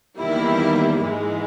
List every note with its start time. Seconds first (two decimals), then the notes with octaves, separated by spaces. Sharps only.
0.18 E2 D#3 G3 A#3 E4
1.01 G#2 E3 G#3